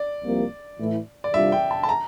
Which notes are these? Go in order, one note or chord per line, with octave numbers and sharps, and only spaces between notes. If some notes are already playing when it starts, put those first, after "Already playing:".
Already playing: D5
C2 C3 F3 A#3
A2 E3 A3 E4
D5
C2 C3 G3 D4 F4 E5
G5
A5
A5
A#5